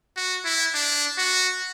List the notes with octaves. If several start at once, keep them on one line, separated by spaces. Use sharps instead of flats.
F#4
E4
D4
F#4